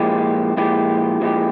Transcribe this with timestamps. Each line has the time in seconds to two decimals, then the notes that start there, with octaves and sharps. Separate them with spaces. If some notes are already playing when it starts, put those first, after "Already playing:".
Already playing: A#2 F3 G#3 E4 G4
0.57 A#2 F3 G#3 E4 G4
1.21 A#2 F3 G#3 E4 G4